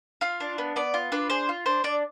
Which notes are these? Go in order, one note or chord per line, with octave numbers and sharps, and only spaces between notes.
F4 F5
D4
B3
B3 D5
F4
D4 B4
G#4 C5
F4
D4 C5
D4 D5